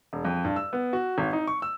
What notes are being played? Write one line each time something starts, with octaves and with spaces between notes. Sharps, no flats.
E1
F2
G2
E6
B3
F#4
G#1
D#4
C#6
E6